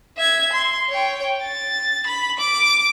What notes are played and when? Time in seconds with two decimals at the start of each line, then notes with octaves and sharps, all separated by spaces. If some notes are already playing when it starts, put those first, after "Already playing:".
0.17 E5 G#6
0.52 C6
0.89 C#5 G5
1.43 A6
2.07 B5
2.40 D6